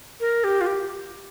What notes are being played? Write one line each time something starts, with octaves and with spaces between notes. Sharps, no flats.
A#4
G4
F4
G4